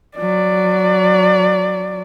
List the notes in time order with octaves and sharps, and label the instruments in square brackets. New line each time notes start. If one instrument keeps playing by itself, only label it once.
[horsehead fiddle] F#3 D5